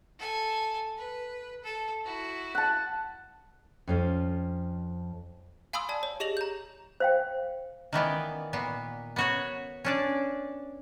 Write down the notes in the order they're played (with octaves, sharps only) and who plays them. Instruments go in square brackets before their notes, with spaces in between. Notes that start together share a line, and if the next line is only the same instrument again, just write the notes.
[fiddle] A4 G#5
B4
A4
E4 F#4
[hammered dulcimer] F#5 A5
[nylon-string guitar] F2 C#4 F4
[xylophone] F5 G#5 B5 C6 D#6 E6
D5 A5
C#5
G4 G#4 D#5 A#6 F7 F#7
A#5 G6
[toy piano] C5 F5 G5
[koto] D#3 E3 B3 D5
A#2 B3
B3 F#4 C#5
C#4 D4 D5